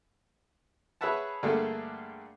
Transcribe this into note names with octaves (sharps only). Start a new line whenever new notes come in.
G#4 B4 C#5 E5 F#5 A5
G2 D3 A3 A#3 G#4